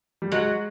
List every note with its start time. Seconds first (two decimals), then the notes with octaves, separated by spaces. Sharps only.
0.22 G3
0.32 F#3 G#3